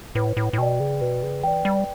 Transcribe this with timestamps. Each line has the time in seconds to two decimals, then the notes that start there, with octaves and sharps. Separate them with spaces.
0.15 A2 B4
0.37 A2
0.53 A2
0.58 B2 D5 G5
0.80 C#3
1.01 B2 B4
1.23 C#3
1.43 E3 D5 G5
1.65 G3